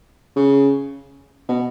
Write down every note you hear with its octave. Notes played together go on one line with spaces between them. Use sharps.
C#3
B2